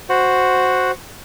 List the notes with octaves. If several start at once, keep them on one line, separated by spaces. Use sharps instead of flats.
F#4 C5 F#5